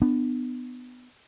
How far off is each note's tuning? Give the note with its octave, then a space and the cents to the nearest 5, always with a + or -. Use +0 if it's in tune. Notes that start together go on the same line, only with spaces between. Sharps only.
B3 +15 D4 +35